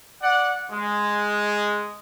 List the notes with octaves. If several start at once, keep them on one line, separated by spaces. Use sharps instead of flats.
D5 F#5
G#3